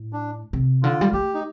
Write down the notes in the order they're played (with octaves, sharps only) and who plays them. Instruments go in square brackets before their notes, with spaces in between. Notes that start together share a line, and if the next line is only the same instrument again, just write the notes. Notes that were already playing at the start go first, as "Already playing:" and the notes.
Already playing: [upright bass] A2
[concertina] D4
[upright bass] C3
[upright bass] D3 [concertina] F4
[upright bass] G3
[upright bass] A3 [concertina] G4
[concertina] D#4